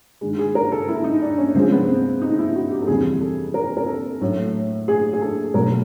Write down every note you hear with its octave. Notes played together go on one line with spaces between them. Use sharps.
G2 D#3 G#3
G#4
A#4
A4
E4
D#4
D4
C#4
C3 F3 G#3 C4
B3
C4
D#4
E4
F#4
G4
A4
F2 C3 E3 G3 G#4
A4
A#4
A#4
A4
A2 F#3 A3
G#4
G#4
A4
B2 F#3 A3 A#4